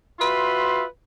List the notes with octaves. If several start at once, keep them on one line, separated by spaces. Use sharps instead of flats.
F4 F#4 B4 E5 C6